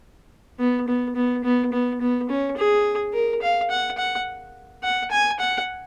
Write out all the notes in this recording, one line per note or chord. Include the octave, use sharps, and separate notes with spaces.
B3
B3
B3
B3
B3
B3
C#4
G#4
A#4
F5
F#5
F#5
F#5
G#5
F#5